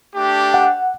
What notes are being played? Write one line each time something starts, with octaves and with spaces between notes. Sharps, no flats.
A3 D4 G4
F#5